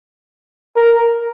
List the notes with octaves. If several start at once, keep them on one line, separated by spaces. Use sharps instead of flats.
A#4